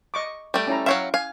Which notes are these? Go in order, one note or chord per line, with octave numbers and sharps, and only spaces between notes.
D#5 C#6 D6
G3 A3 G5
C#4 E4 A#5
F#3 C#5 E5 F5 G5
F5 G#5